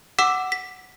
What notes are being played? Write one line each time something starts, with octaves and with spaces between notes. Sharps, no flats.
F#5 D6 E6 B6 E7
B6